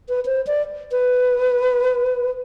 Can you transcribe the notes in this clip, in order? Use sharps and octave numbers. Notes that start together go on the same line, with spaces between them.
B4
C5
D5
B4